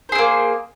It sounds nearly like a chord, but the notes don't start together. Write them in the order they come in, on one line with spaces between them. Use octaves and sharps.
C5 G#4 C4 A#3